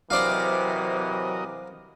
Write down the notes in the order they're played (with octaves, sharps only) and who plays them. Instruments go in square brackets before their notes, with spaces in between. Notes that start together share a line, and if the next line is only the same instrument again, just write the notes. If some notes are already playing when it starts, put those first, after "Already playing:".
[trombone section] C3 E3 [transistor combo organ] F#3 A#4 D#5 [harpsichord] C5 D5 F5